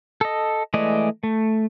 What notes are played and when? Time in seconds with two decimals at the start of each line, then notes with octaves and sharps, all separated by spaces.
0.21 A4 D#5
0.74 E3 G#3 A3 D5 D#5
1.23 A3